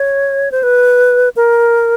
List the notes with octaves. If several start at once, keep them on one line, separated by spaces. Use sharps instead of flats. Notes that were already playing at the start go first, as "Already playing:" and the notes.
Already playing: C#5
C5
B4
A#4